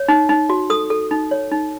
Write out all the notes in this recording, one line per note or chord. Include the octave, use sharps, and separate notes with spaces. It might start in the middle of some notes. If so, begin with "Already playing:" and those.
Already playing: C#5
D#4
D#4
F#4
A4 D#6
A4
D#4
C#5
D#4